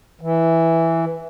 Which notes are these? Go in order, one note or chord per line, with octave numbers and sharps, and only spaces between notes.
E3